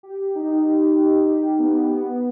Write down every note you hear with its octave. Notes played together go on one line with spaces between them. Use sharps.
G4
D#4
G4
D#4
G4
B3
B3